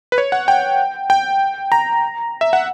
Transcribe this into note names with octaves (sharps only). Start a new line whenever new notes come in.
B4
C#5
F#5
G5
G5
A#5
E5
F#5